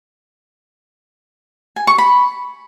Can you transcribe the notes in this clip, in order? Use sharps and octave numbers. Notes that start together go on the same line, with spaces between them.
G#5
C#6
B5